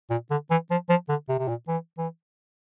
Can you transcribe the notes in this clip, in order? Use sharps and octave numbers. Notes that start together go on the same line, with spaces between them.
A#2
D3
E3
F3
F3
D3
C3
C3
A#2
E3
E3